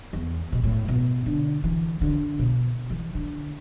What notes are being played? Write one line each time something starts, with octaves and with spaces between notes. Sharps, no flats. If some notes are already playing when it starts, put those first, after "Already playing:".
E2
B2
A2
B2
D3
E3
D3
B2
E3
D3